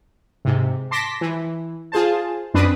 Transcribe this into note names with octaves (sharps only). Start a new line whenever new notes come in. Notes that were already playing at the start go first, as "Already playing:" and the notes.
G#2 C3
A5 C6 D6 A#6 B6
E3
F4 G#4 C5 A5
F#2 C4 D4 B4 D#6